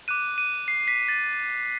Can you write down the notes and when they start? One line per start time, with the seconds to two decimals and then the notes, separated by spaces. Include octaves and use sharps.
0.08 D6 F#6 D#7
0.38 D#7
0.68 C7
0.88 B6
1.08 A6